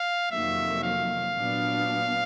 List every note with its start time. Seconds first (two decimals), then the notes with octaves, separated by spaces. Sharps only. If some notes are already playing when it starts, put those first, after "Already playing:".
Already playing: F5
0.31 F2 C3 D#3 F#3 A#3 E5
0.83 F5
1.36 A#2 F#3 B3 D4